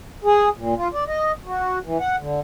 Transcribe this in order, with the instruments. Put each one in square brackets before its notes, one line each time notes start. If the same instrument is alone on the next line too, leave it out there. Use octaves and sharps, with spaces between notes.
[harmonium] G#4
A#2
F4
D5
D#5
F#4
E3
F#5
D3